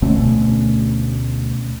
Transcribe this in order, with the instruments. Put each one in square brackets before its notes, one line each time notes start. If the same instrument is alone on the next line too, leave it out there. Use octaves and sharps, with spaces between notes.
[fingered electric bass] D2 B2 A3 C#4